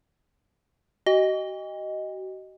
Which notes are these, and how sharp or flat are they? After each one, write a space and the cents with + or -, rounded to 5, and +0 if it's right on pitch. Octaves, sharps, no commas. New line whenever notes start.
F#4 +40 D#5 +0 G5 +45